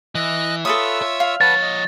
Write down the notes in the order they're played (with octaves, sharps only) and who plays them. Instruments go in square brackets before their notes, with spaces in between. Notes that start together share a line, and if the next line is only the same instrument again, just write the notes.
[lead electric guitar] E3 [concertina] D#5 F#6
[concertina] F4 E5 E6 [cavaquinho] A4 B4 D#6 [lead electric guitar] C#5
[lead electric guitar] C#5
[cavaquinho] F5
[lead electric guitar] F3 C#5 [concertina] B4 F#5 A5 [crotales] A6
[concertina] D#5